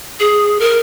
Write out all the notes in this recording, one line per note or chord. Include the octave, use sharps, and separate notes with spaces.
G#4
A#4